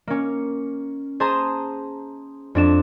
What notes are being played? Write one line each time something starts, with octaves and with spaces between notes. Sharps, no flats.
A#3 C#4
G#4 C5 A5 A#5 C6 D#6
F2 D4 E7